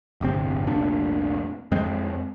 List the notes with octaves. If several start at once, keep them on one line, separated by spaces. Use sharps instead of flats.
D1 G1 C3 C4
F1 C2 A#2 D4
F2 G#3 C4